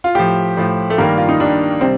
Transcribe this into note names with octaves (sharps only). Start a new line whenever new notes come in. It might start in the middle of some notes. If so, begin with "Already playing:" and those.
F4
A2 F3 G4
A2 F3
A3
G2 D#3 G3 A#3
F4
D#4
G2 D#3 G3 D4
C3 G3 C4